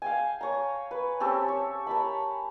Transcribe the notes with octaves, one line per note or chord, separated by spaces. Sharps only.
F5 G5 G#5
C#5 A#5
B4
C4 C#4 G4 A4
C#5
A#4 A5 B5